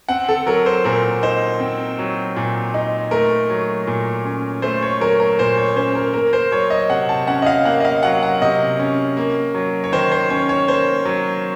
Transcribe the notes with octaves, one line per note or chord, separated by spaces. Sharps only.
C4 F#5
A4
F#3 A#4
C5
A#2 A#4
D#4 C5
C4
F#3
A#2
D#4
A3 A#4
F#3
A#2
C#4
A3 C5
C#5
F#3 A#4
A#4
A#2 C5
C#5
C#4 C5
A#4
A#3 A#4
C5
F#3 C#5
D#5
C3 F#5
A5
C#4 F#5
D#5
F5
A#3 F#5
D#5
F5
F#3 F#5
F#5
C3 D#5
C#4
A#3
F#3
C#5
D#3 C5
C5
C#4 C#5
C#5
A#3 C5
F#3